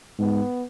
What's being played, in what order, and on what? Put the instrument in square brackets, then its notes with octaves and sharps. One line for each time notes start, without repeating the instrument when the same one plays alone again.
[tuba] G#2 [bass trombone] B3